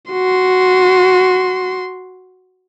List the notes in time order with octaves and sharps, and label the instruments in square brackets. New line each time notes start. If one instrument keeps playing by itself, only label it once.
[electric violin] F#4 C6